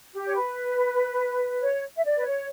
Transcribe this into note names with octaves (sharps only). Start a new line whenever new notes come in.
G4
C#5
B4
C#5
E5
D5
B4
C#5